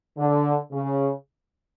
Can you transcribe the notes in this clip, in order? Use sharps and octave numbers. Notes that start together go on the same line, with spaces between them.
D3
C#3